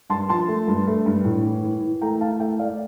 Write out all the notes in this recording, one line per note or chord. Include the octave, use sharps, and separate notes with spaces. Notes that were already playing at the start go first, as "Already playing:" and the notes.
G2 A5 C6
F3 A5 C6
A3
G2
A3
G2
A2
E3
E3
E3
A3 G5 A#5
E3 F5 A5
A3 E5 G5
A3 D5 F5
D5